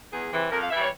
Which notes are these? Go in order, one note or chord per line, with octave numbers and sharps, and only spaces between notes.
E2 G#4
C3 E3
F2 A#4
F5
E3 G3 E5
C#5